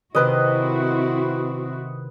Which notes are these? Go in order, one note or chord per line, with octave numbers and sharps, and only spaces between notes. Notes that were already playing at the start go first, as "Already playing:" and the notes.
C3 D#3 C4 E4 F#4 B4 D#5